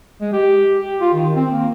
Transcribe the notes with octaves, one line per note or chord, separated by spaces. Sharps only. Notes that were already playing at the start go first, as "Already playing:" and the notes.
G#3
G4
G4
F4
D#3
C4
A#3